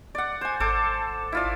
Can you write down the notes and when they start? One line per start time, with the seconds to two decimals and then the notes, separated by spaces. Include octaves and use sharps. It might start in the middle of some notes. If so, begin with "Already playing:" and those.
0.15 D5 F#5
0.41 C5 G#5
0.60 G#1 A4 C5 D6
1.32 E4 F4 D5